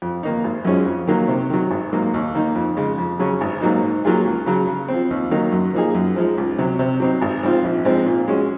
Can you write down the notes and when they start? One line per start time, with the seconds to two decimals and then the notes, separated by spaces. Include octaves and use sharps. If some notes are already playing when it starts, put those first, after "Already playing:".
0.02 F2
0.23 D#3 A#3 D#4
0.44 G#1
0.65 F#2 F3 G#3 C#4
0.86 F2
1.07 D#3 F#3 A#3
1.28 C3
1.50 D#3 F#3
1.71 G#1
1.93 G#2 F#3 A#3
2.14 D#2
2.34 D#3 A#3 D#4
2.56 F2
2.77 C#3 G#3
2.98 F2
3.20 C#3 F#3 C#4
3.41 G#1
3.61 G#2 F#3 A#3 D#4
3.83 G#2
4.05 F#3 A#3 F4 G#4
4.25 C#2
4.46 C#3 F#3
4.67 C#3
4.88 F3 C4
5.10 D#2
5.31 D#3 F#3 A#3 D#4
5.52 F#2
5.74 F3 A#3 D#4 G#4
5.95 F#2
6.16 F3 G#3 D#4
6.38 C#2
6.58 C3 F#3
6.79 C3
7.00 F#3 C4 D#4
7.22 G#1
7.43 G#2 F3 C4 F4
7.64 A#1
7.85 G#2 F3 G#3 C4
8.06 A#2
8.28 G#3 C#4 F#4